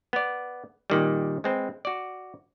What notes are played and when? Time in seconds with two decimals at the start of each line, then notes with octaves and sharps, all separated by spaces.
0.13 B3 D5
0.90 A#2 D#3 G3
1.44 G#3 C4 B4
1.85 F#4 D5